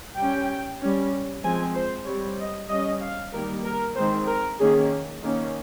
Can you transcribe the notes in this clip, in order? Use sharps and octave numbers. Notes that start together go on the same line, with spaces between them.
G3 C#4 G5
G3 C#4
F3 G#3 C4 G#5
C5
G3 C4 C#5
D#5
G3 C#4 D#5
F5
D#3 G3 A#3 A#4
A#4
D#3 G#3 C4 C5
A#4
D#3 A#3 C#4 G#4
D#3 A#3 C#4